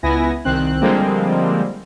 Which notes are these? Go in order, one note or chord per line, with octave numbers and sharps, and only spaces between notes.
C#2 B3 E4 G#5 A#6
C2 D#3 C4 F#6
D3 F3 G3 G#3 A#3 C4